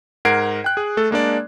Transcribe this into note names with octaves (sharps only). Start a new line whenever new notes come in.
G#2 A#4 F#5 G#6 C7 D7
G5 F#6
G#4
A3 A4
G#3 A#3 D4 D5